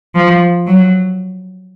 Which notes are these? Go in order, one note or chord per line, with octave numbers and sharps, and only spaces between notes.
F3
F#3